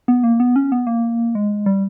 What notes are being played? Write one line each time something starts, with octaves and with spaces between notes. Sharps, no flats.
B3
A#3
B3
C#4
B3
A#3
G#3
G3